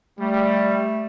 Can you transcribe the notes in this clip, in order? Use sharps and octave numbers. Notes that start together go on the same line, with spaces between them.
G3 A3